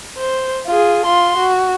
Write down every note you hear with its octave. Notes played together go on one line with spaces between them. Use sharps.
C5
F4 G#4
F4 C6
F#4